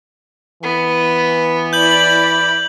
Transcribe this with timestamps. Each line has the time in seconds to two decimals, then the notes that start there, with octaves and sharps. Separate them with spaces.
0.63 E3 B3
1.73 E4 D5 B5 G6 F#7